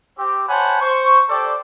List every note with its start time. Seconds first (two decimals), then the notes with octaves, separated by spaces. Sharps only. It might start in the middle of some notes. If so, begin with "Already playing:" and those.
0.18 C4 G4
0.48 C5 C#5 F#5 G#5 A5 B5
0.81 C5 C#6
1.29 G4 A4 C5 D5